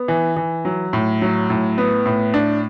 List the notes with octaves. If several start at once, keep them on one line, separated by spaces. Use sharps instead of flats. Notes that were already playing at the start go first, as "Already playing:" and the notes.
Already playing: B3
E3
E3
F#3
A2
F#3
A2
B3
A2
D4